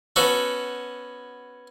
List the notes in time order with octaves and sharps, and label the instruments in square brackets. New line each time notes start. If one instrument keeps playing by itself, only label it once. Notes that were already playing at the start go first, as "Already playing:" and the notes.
[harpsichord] B3 C#4 F#4 A4